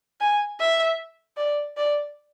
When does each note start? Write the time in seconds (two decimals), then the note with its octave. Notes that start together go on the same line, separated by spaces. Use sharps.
0.21 G#5
0.59 E5
1.38 D5
1.77 D5